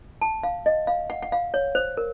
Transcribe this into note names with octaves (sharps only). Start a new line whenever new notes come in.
A5
F5
D#5
F5
F#5
F#5
F5
C#5
C5
A#4